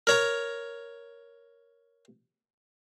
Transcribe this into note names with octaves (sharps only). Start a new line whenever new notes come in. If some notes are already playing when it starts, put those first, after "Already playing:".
A#4 C#5 A#5